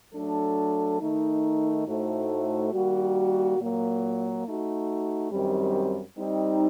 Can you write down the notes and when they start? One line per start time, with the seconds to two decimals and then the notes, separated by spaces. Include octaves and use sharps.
0.14 F#3 A3 D4 A4
1.00 D#3 A3 D#4
1.86 A2 A3 D#4 F#4 C5
2.72 D#3 G3 A#3 F#4
3.59 A#2 F#3 A#3
4.45 A3 D#4 F#4
5.31 F#2 D#3 G3 C4 G4
6.18 G3 C4 D#4